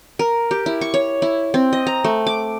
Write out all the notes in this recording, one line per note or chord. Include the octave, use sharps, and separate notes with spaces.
A#4
G4
E4
C#6
C#5
E4
C4
D#5
A#5
A3
D6